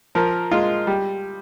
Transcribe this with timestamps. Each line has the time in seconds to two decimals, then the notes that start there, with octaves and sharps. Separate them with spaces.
0.15 F3 A#4
0.51 G#3 F4
0.87 G3